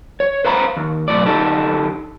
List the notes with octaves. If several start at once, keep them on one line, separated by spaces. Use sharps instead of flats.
C#5
B4 C5 F5 A#5 B5
D#2
B1 F#2 A2 D5
D3 D#4 G4 A4